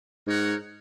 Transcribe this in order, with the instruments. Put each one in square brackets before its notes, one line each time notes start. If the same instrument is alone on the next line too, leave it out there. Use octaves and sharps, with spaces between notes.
[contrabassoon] G#2 [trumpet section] D#4 A#4 C#5 F#5